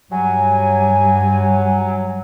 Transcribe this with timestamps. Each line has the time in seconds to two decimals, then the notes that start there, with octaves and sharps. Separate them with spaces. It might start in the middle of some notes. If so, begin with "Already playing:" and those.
0.12 G2 F#3 G3 G#5